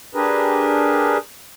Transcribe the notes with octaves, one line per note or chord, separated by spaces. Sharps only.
D4 G4 G#4 A#4 B4